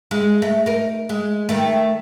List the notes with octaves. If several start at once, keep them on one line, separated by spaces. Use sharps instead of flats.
G#3
A3
D#4 A#4
G#3
D#3 A3